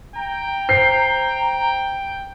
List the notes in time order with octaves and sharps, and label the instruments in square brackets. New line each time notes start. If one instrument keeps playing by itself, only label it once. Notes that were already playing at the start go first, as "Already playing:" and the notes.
[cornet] G5 [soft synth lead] A#5
[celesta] C5 G6 [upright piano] C7